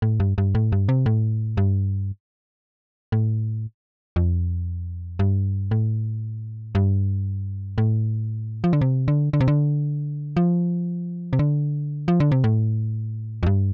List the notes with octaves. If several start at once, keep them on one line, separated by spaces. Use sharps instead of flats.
A2
G2
G2
A2
G2
C3
A2
G2
A2
F2
G2
A2
G2
A2
F3
D3
C3
D3
D3
C3
D3
F3
C3
D3
F3
D3
C3
A2
F2
G2